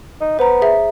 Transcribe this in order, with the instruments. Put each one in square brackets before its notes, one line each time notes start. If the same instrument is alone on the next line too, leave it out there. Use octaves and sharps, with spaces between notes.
[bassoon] D#4
[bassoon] B3 [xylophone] C5 A#5
[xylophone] G#4 E5